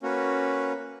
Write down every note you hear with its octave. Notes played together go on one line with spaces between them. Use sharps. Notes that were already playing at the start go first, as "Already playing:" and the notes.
A#3 C#4 F#4 B4